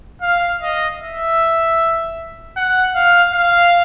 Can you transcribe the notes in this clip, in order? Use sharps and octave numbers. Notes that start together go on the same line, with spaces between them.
F5
D#5
E5
F#5
F5
F5